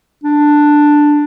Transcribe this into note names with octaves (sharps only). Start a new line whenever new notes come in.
D4